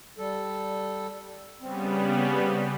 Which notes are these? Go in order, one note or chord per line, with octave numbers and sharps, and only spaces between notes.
G3 A4
C#3 G3 B3 C4